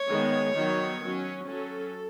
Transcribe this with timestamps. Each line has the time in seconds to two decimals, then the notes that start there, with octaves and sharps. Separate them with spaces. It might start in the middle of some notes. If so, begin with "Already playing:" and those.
Already playing: C#5
0.09 D#3 G#3 B3
0.55 D#3 F#3 B3
1.01 F#3 C#4
1.46 F#3 C#4 A4